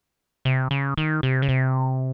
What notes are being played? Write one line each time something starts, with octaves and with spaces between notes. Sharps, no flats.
C3
C#3
D#3
C3
C#3
C3